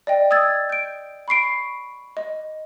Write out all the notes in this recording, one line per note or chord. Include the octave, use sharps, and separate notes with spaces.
D5 D#5 G5
D#6 E6 G#6 A6
G6 D7
B5 C#6 C7 D7
D#5